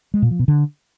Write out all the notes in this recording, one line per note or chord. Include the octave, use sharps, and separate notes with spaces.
G#3
A#2
F3
B2
D3